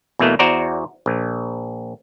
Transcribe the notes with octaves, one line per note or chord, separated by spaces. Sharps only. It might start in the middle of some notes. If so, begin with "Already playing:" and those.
E2 B2 E3 A3 A#3
E2 F#4 C5 D5 A#5
A#1